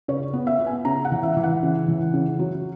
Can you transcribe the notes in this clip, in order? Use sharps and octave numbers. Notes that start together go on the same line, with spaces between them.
C#3 C#5
B3
E5
B3
G#5
C#3 A#5
F#5
E3
E5
E3
F#5
C#3
E3
C#3
F#3